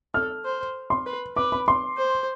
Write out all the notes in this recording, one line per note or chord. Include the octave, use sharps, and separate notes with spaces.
A4 F6
C5
C6
B4
B4 D6
B5
C6
C5